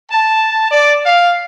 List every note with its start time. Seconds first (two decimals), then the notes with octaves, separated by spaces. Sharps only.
0.11 A5
0.71 D5
1.05 F5